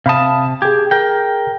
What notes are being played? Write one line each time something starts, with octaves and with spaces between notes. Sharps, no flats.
C3 F5 A5 B5 D#6
G4 G#4 G#6
A#4 G5